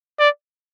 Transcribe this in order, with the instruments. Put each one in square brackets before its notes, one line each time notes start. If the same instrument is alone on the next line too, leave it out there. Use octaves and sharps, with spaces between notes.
[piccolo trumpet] D5